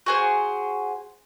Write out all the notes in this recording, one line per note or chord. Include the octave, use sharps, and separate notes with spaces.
F#4 G#4 C5